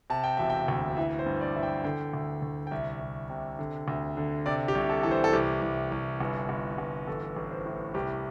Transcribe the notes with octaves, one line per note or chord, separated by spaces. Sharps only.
C3 A5
G5
E1 E5
G5
D2
E3 E5
C5
G2
D5
E3 E5
G5
D3 G5
D2
D2
G5
C2 E5
C2
C3
D3
D2
D3
C3 D5
G4
C2
G4
A4
E3 A4
C5
A4
C2 G4
C2
C2
G1
G1
G1
A1 A4
A1
C5
A2
C2 G4